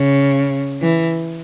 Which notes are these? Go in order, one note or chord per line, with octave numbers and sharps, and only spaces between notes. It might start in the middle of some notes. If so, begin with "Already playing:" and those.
Already playing: C#3
E3